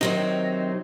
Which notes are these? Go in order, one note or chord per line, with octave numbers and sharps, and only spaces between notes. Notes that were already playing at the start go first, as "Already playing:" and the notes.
C3 D#3 F#3 C4 D#4